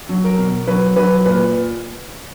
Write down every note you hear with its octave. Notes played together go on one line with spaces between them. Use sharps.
F#3
A#4
B2
F#3 B4
F#3 B4
A#2 B4